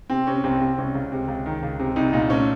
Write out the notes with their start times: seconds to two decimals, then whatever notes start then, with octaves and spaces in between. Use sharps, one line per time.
0.10 C3 C4
0.27 C3 C#4
0.44 C2 C4
0.61 C3 C4
0.78 C2 C#4
0.95 C#2
1.12 C3
1.28 C#2
1.46 D#3
1.63 C#2
1.79 C3
1.96 C2 D#4
2.13 A#2 D#4
2.30 A3 C#4